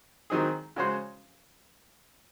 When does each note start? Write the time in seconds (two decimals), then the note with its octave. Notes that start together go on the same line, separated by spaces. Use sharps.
0.30 D#3 F#3 C4 D#4 G#4
0.76 C#3 G#3 C#4 F#4 C5